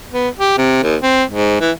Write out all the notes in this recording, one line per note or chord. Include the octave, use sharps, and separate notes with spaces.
B3
G4
C3
D#2
C4
G#2
E3